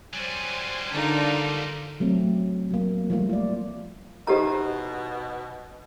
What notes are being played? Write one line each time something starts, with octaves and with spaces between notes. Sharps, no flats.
F#3 G3 C5 G#5
D3 D4 D#4 F4 A#4
F#3 A3 C4
F#3 A#3
F3 G3 A3 A#3 F4
F4 D5
B2 D#4 E4 G4 A4 C5 A#5